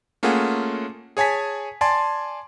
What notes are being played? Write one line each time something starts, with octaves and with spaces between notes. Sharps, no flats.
A3 A#3 C#4 F4 G#4 F#5
G#4 C#5 G#5 A5 B6
D5 G#5 A5 C6